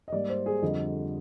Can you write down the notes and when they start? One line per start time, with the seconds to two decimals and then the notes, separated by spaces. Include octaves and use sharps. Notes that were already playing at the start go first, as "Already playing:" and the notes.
0.08 D#5
0.12 G#2 G3 A#3 D5
0.29 C5
0.46 G#4
0.62 F2 D3 G3 D#5